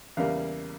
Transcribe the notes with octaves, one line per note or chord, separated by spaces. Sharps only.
E2 C#3 G3 A#3 F5